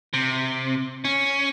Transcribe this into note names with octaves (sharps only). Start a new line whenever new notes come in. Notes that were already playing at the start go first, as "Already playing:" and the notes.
C3
C#4